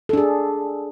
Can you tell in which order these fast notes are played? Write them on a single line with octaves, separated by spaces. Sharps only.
A4 D4 G#4